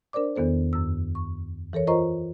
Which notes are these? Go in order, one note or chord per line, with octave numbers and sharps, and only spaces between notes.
D4 A#4 C5 D5 D6
E2 D#3 B3 A4 C5
F#2 E6
C#6
E3 A4 A#4 C#5
F4 A#4 C5 D#5 A#5 C#6